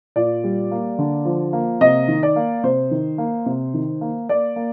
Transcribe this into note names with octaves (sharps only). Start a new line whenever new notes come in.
A#2 D5
G3
A#3
D3
F3
A#3
C3 D#5
D#3
D5
A#3
C3 C5
D#3
A#3
C3
D#3
A#3
A#3 D5
A#3